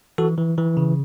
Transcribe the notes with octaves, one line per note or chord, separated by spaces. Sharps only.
E3 F#4 A4
E3
E3
C#3